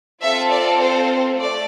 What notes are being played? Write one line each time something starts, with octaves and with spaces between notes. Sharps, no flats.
C4 F4 A4 E5
D5
C5
A3 D5